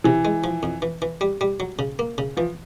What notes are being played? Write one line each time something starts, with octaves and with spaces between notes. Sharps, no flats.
C3 E3
G#3
F3
F2
E3
E3
G3
G3
F#3
C#3
A#3
C#3
E3 F3